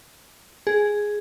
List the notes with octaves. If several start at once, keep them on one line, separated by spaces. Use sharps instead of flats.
G#4